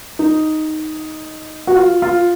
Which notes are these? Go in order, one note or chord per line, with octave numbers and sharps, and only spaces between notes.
D#4
F#4
F4
F4